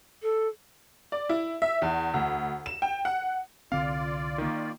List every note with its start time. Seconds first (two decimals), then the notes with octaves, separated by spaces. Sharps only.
0.22 A4
1.12 D5
1.29 E4
1.62 E5
1.82 E2
2.14 D2
2.66 E7
2.82 G5
3.05 F#5
3.72 C2 D3 C4 F4 D5 F5
4.38 D#3 A#3